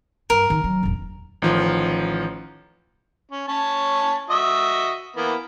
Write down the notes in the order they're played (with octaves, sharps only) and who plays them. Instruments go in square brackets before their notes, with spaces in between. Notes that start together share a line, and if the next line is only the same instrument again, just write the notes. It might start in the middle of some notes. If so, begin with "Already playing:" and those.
[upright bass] G2 [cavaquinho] A#4
[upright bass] D#3
F#3
E1 A2
[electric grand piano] A1 D#3 F3
[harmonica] C#4
C#4 C#5 A5
F#4 D#5 E5
E3 A#3 B3